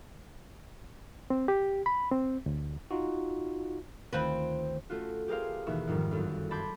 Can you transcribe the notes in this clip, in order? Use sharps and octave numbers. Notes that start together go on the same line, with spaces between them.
C4
G4
B5
C4
D2
D#4 F4 F#4
D2 D#3 C4 F4 B4
A3 C#4 F4 F#4
G4 G#4 A#4 C5 F5
D#2 B2 E3 A#3 E5 C#6
F2 G#2 D#3 G3
G1 F#2
A5 B5 C6 D6 G6 G#6